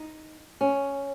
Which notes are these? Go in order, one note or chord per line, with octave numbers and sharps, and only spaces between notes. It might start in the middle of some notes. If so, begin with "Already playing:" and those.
Already playing: D#4
C#4